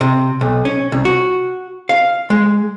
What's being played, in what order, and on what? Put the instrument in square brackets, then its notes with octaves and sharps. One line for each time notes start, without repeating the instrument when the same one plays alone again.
[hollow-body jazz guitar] C3
B1
C#4
C2
F#4
F5
G#3